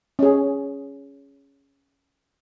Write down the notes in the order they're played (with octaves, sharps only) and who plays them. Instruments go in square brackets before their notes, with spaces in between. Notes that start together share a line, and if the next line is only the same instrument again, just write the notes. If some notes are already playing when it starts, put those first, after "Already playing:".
[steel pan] C#4 G#4